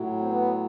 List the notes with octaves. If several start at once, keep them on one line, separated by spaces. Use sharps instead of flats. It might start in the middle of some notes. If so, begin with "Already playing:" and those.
Already playing: A2 F#3
C4
B3